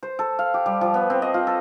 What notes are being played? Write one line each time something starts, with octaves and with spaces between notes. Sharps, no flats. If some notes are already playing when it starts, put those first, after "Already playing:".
C5
A4
F5
G4
G3
F3
B3
C4
D#5
F4
A4